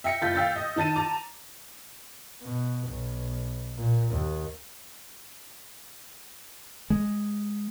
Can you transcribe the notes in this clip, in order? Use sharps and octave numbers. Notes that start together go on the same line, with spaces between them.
E5 G5 A#6 C#7
F#1 F4 G6 A6 B6
F5 G5 E6 G6 A6 B6
D#5
D#3 D#4 A5 A6 D#7
A5 A#5 D6
B2
B1
A#2
D#2
G#3